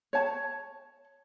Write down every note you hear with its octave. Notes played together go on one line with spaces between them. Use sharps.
C#5 A5